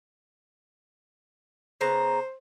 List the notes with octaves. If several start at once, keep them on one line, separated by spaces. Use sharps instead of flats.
C#3 B3 C5 A#5